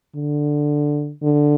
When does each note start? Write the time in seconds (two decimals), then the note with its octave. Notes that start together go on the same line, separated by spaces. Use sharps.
0.15 D3
1.23 D3